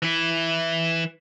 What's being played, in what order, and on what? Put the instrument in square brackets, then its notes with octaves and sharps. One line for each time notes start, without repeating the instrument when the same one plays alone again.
[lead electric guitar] E3 E4